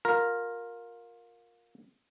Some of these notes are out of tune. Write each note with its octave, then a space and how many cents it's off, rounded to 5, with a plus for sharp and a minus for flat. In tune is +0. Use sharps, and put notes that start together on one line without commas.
F4 +25 A#4 +0